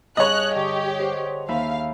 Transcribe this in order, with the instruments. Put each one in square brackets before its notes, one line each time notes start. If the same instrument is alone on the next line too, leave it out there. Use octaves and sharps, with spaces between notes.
[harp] G2 G#4 [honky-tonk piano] C#5 D#5 [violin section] F#6
[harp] D3 [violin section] G4
[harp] C5 F#5
[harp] D#2 E5 B5 [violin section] F5